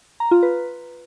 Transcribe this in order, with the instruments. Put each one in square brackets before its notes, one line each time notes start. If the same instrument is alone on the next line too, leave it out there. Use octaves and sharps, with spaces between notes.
[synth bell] A#5
F4
B4